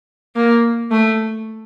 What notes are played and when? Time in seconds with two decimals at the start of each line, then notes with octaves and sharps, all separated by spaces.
0.36 A#3
0.91 A3